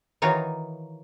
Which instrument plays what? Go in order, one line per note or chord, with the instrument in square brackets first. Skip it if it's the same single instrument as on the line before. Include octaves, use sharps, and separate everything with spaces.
[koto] D#3 E3 D#4 F4 F#4 C#5